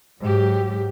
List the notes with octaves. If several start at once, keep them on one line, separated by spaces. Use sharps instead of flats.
G#2 F#3 G4